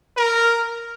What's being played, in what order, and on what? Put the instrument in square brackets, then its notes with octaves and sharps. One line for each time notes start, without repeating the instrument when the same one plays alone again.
[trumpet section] A#4